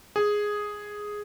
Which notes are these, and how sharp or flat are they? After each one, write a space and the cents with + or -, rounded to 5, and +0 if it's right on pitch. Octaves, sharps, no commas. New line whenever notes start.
G#4 +0